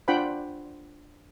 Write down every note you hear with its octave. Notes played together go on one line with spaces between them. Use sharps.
D4 F4 C5 F#5 G5 B5